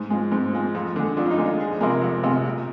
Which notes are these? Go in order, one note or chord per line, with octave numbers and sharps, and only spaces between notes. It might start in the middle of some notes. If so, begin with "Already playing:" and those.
Already playing: G#2
F3 G#3
G#2 C4
F3 G#3
F2
D3 G#3
F2 D4
F4
D#4
D3 G#3
F4
F2 G#4
C3 F3 G#3 A#4
F2
C3 F3 G#3
A#2